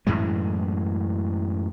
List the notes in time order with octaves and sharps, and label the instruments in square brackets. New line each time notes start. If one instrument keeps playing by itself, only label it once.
[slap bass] F#2 A2 E3 G#3